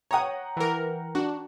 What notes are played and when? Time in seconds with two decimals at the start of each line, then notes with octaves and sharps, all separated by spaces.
0.11 C#5 F#5 G5 A#5 D#6
0.57 E3 A#4
1.15 D4 F#4